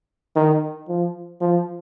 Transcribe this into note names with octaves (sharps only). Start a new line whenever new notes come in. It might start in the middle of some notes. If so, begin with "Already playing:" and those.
D#3
F3
F3